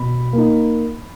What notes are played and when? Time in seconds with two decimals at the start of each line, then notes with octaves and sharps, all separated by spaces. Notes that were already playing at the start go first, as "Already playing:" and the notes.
Already playing: B2 B5
0.33 A#3 D#4